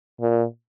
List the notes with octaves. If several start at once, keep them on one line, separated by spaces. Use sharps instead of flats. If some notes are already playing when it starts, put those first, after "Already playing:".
A#2